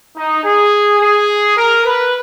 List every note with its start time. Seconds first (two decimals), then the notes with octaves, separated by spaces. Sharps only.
0.16 D#4
0.44 G#4
0.99 G#4
1.56 A#4
1.85 B4